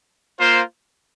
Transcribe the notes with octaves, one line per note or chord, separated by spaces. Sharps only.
A#3 F4 C5